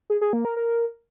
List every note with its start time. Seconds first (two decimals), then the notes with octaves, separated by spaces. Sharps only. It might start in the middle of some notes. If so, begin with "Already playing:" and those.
0.10 G#4
0.21 G#4
0.33 A#3
0.45 A#4
0.56 A#4